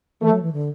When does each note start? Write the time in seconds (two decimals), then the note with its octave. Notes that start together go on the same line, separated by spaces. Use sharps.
0.21 E3 A3
0.31 F#3
0.42 E3
0.53 D3